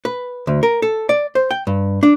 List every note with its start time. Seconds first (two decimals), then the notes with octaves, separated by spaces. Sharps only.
0.05 B4
0.47 D2
0.63 A#4
0.82 A4
1.09 D5
1.35 C5
1.51 G5
1.67 G2
2.03 D4